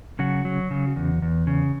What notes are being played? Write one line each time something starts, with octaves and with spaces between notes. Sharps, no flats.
C#3 F#3 F#4
F#3
C#3
E2
E2
C#3